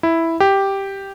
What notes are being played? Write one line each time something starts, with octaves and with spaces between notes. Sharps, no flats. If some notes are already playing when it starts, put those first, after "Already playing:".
E4
G4